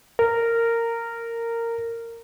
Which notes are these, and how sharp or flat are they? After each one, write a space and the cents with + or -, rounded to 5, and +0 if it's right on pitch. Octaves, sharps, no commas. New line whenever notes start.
A#4 -15